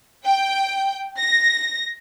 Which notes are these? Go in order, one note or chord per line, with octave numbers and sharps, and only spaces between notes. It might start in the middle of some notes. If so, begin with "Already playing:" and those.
G5
A#6